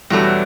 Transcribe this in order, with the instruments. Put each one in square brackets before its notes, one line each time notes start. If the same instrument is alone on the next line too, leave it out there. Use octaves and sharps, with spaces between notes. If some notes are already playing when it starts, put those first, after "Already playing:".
[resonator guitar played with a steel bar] E2 B2 F#3 A3 D4 [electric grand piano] G3